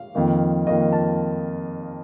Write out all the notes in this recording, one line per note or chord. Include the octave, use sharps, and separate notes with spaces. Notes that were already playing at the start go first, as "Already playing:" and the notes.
Already playing: F5
F2 D#3 A#3
F2 D#3 A#3 D#5
A5